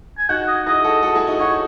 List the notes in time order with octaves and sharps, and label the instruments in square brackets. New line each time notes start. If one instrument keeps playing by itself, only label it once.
[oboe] G#5
[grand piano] D#4 F#4 [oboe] F#5
[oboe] D#5
[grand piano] E4 G#4 [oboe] D#5
[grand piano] F#4 A4
F#4 A4
E4 G#4
D#4 F#4
[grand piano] D#4 F#4 [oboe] C#5